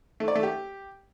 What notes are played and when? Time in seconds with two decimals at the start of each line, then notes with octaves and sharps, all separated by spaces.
0.20 A3
0.28 D5
0.36 A3
0.43 G4